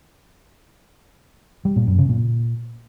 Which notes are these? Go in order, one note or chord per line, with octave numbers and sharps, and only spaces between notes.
G3
A#2
F#2
C#3
A#2